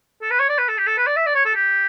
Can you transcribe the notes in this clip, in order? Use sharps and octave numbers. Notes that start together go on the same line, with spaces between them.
A4
B4
C#5
D5
B4
A4
G4
A4
B4
D5
E5
D5
C#5
A4
G4